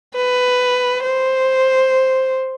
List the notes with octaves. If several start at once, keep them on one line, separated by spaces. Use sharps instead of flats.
B4
C5